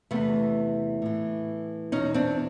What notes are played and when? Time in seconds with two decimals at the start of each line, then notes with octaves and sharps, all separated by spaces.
0.11 E2 C3 E3 A3 B3
1.02 A2 E3
1.92 E2 B2 C#4 D#4
2.14 C4 D4